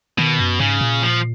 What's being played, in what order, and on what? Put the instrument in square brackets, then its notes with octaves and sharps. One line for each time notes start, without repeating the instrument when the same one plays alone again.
[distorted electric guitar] B2 [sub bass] D#3
[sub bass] F#2
[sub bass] G#2 [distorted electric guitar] C#3
[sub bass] A#2
[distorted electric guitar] F3